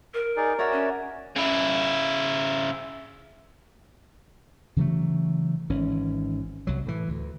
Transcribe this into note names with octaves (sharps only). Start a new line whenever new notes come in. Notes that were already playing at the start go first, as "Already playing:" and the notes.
A#4
D#4 G#4 D5
D4 F#4 A#4 C#5 D5 E5
C#4
C#3 E4
C#3 E3 F#3 A3
G#1 E3 C#4
C2 F#3
A2 E3
D2